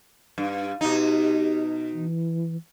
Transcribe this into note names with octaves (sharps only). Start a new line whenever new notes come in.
G2
B2 D#4 G4
E3